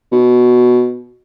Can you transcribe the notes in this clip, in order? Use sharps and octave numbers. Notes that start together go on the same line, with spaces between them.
B2